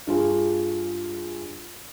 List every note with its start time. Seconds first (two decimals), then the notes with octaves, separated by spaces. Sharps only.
0.07 G2 F4 G#4